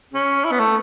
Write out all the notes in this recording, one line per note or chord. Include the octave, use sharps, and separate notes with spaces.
C#4
E4
B3
A3